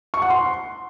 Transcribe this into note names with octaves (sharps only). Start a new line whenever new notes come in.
C#6
F#5
C6